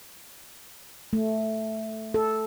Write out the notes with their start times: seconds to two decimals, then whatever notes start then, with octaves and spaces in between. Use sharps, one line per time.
1.13 A3
2.14 A4